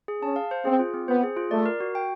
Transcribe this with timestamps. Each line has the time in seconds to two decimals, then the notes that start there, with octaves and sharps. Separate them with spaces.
0.08 G#4
0.22 C#4 A5
0.36 F5
0.51 C5
0.65 C4 G#4
0.79 F4
0.94 C4
1.08 B3 C5
1.23 G#4
1.37 F4
1.51 A3 D5
1.66 A#4
1.80 F#4
1.95 G5